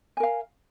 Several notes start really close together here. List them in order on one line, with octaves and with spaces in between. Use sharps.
G#5 A#4 F5